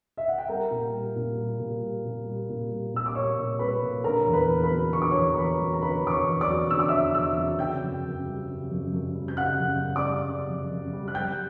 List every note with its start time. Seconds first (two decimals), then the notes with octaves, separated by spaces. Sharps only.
0.17 E5
0.28 F#5
0.38 G5
0.48 G3 A#4 A#5
0.71 A#2
0.93 G3
1.16 A#2
1.37 G3
1.60 A#2
1.82 G3
2.05 A#2
2.27 G3
2.49 A#2
2.70 G3
2.94 A#2 E6
3.06 D6
3.15 G3 C#5 C#6
3.38 A#2
3.59 G3 B4 B5
3.82 A#2
4.04 D3 A#4 A#5
4.26 E2
4.33 B4 B5
4.48 E2
4.63 B4 B5
4.71 F#3
4.93 D3 C#6
5.02 D6
5.11 C#5 C#6
5.15 E2
5.33 A#5
5.37 E2 B4 B5
5.60 F#3
5.73 A#5
5.82 D3 B4 B5
6.04 E2 D6
6.11 C#5 C#6
6.26 E2
6.41 D5 D6
6.48 F#3
6.70 D3 E6
6.79 D6
6.88 E5 E6
6.93 E2
7.14 E2 E5 E6
7.38 F#3
7.59 C#3 G5 G6
7.82 F#2
8.05 F#2
8.26 G3
8.48 C#3
8.70 F#2
8.92 F#2
9.15 G3
9.28 G6
9.37 C#3 F#5 F#6
9.59 F#2
9.82 F#2
9.96 D5 D6
10.04 G3
10.26 C#3
10.48 F#2
10.71 F#2
10.93 G3
11.08 F#6
11.14 G3 G5 G6